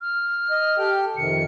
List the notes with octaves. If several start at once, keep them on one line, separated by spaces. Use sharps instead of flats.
F6
D#5
G4 A4 G5
F2 C3 D#3 C#7